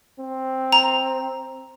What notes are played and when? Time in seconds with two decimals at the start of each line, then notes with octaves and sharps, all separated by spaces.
0.19 C4
0.72 A#5